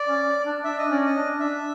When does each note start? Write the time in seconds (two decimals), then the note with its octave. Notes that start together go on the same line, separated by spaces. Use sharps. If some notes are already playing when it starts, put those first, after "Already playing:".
Already playing: D5
0.08 C#4
0.45 D4
0.64 D4 E5
0.78 D#5
0.89 C#4 D5
1.05 D#5
1.15 D4
1.40 D4 E5